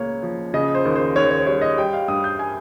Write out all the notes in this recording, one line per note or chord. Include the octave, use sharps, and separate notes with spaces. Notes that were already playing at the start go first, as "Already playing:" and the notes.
Already playing: C#2 C#3 A#3 C#5
F3
C#3 D#5
C5
D#2
C5
D#2 C#5
C#5
G3 C#5
D#5
G3 G5
F5
G2 D#6
G6
G#5